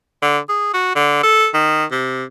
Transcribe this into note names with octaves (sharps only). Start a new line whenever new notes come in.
D3
G#4
F#4
D3
A4
D#3
C3